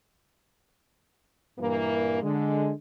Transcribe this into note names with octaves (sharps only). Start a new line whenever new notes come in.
G2 A#2 E3 A#3
D3 G#3